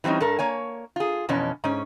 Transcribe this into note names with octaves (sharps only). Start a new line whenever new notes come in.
E3 G3 C4 C#4 D#4
G2 A4 A#4
A#3 C#5 G#5
F4 G#4
F2 B2 E3 C#4
G#2 C#4